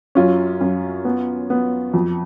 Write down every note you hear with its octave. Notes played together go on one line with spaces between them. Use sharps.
F#2 C#4 F4
F#2
B3
B3
F2